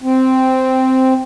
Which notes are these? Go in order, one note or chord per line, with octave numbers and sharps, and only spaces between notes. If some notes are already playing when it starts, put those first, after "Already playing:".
C4